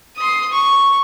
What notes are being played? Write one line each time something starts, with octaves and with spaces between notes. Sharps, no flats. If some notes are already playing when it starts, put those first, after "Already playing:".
C6 D#6
C#6